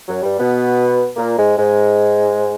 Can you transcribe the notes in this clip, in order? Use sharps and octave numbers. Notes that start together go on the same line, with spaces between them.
F#2 F#3
G2 G3
B2 B3
A#2 A#3
G#2 G#3
G#2 G#3